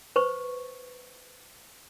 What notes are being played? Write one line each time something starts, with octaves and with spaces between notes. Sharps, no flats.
B4 C5 C#6